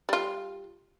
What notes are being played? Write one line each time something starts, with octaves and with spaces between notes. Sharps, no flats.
G3 F4